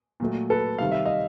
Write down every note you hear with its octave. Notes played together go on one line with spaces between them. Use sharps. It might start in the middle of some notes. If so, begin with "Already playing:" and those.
A#2 F#3 A3
A4 B4
C3 D#3 G3 F5
E5
D#5 F5